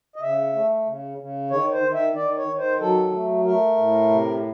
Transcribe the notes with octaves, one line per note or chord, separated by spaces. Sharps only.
D#5
C#3 E5
A3
C#3
C#3
D#3 C#5
C5
D#3
E5
D#3 D5
C#5
D#3
C5
F#3 A4
A3
A3 A#4
A2
C3